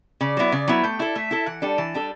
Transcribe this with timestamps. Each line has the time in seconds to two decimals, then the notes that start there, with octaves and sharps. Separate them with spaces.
0.21 C#3 D5
0.37 F#3 B3 E4
0.52 C#3 D5
0.68 F#3 B3 E4 F#5
0.84 A3 G5
0.99 E4 A4 D5
1.15 A3 E5
1.31 E4 A4
1.46 E3 F#5
1.62 G3 D4 A4
1.78 E3 A5
1.94 G3 D4 A4